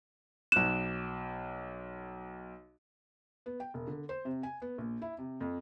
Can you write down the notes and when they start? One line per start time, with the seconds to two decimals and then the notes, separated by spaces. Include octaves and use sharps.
0.52 B1 F#6 E7
3.46 B3
3.60 G5
3.74 E1
3.88 D3
4.09 C5
4.25 C3
4.43 G#5
4.62 B3
4.78 A#1
5.02 E4
5.19 C3
5.41 F2